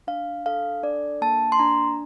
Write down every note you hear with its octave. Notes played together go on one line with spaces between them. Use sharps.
D4 F5
A4 F5
D4 D5
A#3 A5
C6
D4 A#5